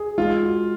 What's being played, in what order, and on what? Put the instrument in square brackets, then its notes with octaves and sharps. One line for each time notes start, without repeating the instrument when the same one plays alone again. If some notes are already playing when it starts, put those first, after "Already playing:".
Already playing: [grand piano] G#4
[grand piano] G#3 [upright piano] F4
[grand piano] F#4